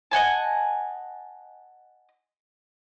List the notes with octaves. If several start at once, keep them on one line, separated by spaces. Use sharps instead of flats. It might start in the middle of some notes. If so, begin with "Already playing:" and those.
D#5 F#5 G#5 A5